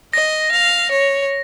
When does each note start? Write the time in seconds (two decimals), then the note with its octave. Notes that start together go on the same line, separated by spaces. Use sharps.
0.13 D#5 A#6
0.52 F5
0.91 C#5